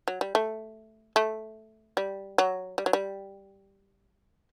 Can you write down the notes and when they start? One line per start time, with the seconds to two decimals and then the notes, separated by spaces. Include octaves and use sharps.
0.08 F#3
0.21 G3
0.35 A3
1.16 A3
1.97 G3
2.38 F#3
2.78 G3
2.86 F#3
2.93 G3